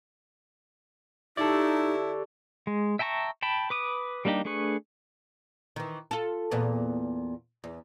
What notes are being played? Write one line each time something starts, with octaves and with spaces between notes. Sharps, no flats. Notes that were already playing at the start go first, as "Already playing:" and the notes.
D#4 E4 G4 A4 D5 A5 C#6
G#3
E5 G5 A5 A#5 C#6
G5 A5 B5
B4 D6 D#6
G3 A#3 D4 D#4 G4
A3 D4 G#4 B4 C#6
D#3 E3
F4 A4
E2 A#2 B3
E2